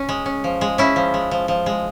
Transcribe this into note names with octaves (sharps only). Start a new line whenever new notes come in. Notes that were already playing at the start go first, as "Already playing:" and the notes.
Already playing: C#4
G#3
C#4
F3
G#3
C#4 E4
F3
G#3
F3
F3
G#3